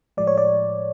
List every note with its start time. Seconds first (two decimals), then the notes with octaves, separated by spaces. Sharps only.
0.17 A2 F3 G#3 D5
0.27 C#5
0.38 D5